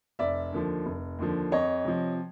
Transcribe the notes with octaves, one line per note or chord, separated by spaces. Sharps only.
F1 D5 E5
D#2 D3 F3
F1
D#2 D3 F3
F2 C#5 D#5
C3 F3